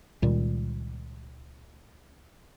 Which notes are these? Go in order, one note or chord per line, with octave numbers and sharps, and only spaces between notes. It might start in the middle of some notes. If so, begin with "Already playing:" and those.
C#2 A#2 D#3 G3